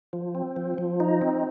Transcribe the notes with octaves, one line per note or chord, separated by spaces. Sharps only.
F3
C4
F3
F3
D#4
C4